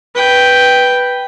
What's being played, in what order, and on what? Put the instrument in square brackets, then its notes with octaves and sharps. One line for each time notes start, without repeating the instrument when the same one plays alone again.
[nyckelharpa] B4 G5